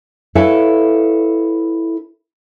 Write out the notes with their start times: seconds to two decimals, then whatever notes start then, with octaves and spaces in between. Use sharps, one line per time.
0.35 E4 A4 B4 C#5 F5 G#5